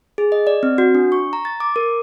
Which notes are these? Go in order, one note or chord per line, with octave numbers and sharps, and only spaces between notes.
G#4
D#5
D5
C4
F#4
D4
C#6
A#5
A6
D6
A#4